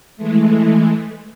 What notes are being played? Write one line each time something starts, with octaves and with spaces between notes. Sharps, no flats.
E3 G#3 A3